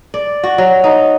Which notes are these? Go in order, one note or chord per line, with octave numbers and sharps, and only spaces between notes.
D5
F#4
F#3
D#4